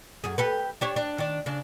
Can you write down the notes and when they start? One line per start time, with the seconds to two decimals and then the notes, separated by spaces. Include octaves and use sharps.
0.24 F#2 G#4
0.38 G4 A4 B4
0.81 D4 G4 C#5
0.96 D4
1.18 D#3 D4
1.46 C#3 D4